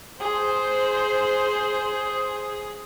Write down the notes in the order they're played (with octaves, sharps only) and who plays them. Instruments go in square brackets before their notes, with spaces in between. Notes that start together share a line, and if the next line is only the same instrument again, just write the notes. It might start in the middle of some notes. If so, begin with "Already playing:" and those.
[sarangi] G#4 [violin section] C5